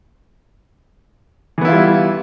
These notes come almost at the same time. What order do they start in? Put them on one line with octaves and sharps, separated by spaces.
E3 B3 E4 F4 G3